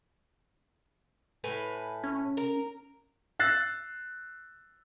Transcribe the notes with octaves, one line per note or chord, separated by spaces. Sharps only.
A2 B4 G#5
C#4
A#4
E6 F#6 A6 C7